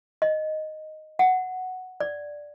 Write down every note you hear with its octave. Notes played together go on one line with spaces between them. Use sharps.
D#5
F#5
D5